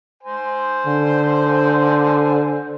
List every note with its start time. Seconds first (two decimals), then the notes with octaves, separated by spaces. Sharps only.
0.23 C5 G#5 C6
0.86 D3